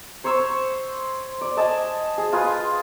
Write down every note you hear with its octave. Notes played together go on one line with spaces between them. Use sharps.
C5 C#5 C#6 E6
D5
D#5 G#5 A5
G#4
F4 G#4 B4